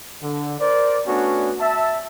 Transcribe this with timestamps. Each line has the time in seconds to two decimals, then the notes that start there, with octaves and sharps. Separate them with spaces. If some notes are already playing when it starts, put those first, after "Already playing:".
0.22 D3
0.60 A#4 C5 D5
1.07 A3 B3 C#4 D4 F#4
1.60 E5 A5